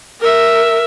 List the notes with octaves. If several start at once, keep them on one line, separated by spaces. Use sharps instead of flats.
A#4 E5